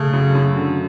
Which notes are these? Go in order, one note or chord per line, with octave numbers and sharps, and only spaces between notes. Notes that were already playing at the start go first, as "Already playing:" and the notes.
Already playing: C#3 A3
F#2
F#2
D3